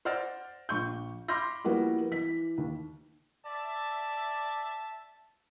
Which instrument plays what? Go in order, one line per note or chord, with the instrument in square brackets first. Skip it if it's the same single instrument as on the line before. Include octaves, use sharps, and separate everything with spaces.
[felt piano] C5 D5 F#5 F6 A6 A#6
A#1 C#6 G6
B5 C6 D6 F6 G6 A#6
F3 G3 A#3 B3 E4 F#4
E3 B6
D#2
[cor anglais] D5 [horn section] E5 A5